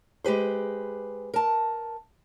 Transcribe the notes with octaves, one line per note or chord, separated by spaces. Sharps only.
G#3 G4 B4 C5
A#4 A5